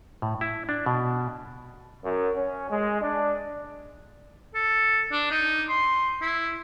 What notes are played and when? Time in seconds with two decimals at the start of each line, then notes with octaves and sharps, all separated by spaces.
0.22 A2
0.41 E4
0.69 D4
0.86 B2
2.04 F#2
2.36 C#4
2.70 G#3
3.02 D4
4.54 A4
5.12 D4
5.31 D#4
5.69 C6
6.21 E4